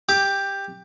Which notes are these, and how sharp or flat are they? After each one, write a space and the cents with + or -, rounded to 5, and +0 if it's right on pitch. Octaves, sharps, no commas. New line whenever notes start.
G4 +10 D6 +0